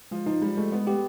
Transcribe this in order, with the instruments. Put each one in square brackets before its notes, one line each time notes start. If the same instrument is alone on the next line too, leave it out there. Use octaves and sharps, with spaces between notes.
[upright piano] F3 [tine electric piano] G#3
[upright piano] F3 [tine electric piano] D#4
[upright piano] G3 [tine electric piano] G#3
[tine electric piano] G#3 [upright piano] A3
[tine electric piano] G#3 [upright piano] B3
[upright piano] B3 [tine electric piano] G4